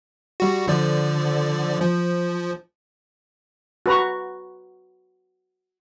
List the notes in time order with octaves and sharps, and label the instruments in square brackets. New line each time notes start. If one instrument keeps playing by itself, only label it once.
[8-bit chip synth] G3 F#4
D3 F3 D5
F3
[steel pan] F#4 B4 A#5 C#6